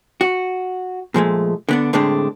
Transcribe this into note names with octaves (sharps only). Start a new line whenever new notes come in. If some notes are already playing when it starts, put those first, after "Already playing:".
F#4
A#2 F3 G#3 A3
D3 B3 D4
A2 D3 G#3 A3 C4 D4